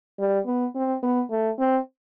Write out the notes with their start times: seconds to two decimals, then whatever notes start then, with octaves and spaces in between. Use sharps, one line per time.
0.19 G3
0.46 B3
0.75 C4
1.03 B3
1.31 A3
1.59 C4